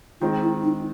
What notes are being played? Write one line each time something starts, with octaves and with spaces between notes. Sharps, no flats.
D#3 G#3 C4 F4
E4
D#4